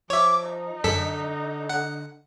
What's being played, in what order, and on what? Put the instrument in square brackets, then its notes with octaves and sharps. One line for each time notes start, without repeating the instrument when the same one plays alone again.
[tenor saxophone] F3 [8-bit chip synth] C#5 E5 [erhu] D6
[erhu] D#4
[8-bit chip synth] F#2 A4 B6 [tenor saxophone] D3
[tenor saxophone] D3 [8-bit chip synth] F#5